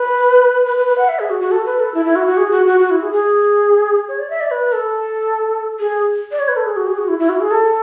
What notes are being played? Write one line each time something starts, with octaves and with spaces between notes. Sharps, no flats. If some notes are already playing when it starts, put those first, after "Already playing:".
Already playing: B4
B4
B4
B4
F#5
E5
G#4
F#4
F#4
A4
B4
A4
E4
E4
F#4
F#4
G#4
F#4
F#4
F#4
E4
G#4
G#4
C#5
D5
E5
D5
B4
A4
G#4
D5
C#5
B4
A4
G#4
F#4
G#4
F#4
E4
E4
F#4
G#4
A4